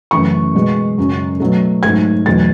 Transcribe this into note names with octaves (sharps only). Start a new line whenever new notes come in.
F#2 C#3 E3 A3 C#6
B2 G#3
F#2 C#3 F#3
B2 F#3 A3
G#2 F#3 A3 G#6
E2 B2 F#3 A3 A6